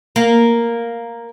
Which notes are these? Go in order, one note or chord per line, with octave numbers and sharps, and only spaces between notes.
A#3